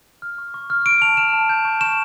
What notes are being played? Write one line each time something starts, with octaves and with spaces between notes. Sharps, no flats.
F6
C#6
C#6
F6
C#6 D7
A5 F7
F6 E7
A5
G6
C#6
C#6 E7